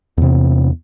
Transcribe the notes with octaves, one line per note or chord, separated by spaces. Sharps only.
E2 C3